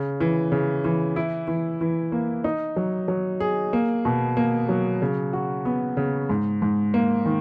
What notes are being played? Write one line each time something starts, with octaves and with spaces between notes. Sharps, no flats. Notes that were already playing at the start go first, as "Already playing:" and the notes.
Already playing: C#3
E3
C#3
E3
E4
E3
E3
A#3
D#4
F#3
F#3
G#4
A#3
B2
A#3
F#3
C#3
F#4
B3
C#3
G#2
G#2
A#3
D#3